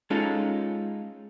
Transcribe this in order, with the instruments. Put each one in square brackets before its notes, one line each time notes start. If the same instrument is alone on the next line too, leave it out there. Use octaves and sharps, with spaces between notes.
[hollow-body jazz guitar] G#3 C#4 D#4 F4 A4